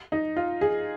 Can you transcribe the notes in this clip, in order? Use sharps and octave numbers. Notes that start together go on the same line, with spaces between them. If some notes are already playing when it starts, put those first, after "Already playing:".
D#4
F4
G#4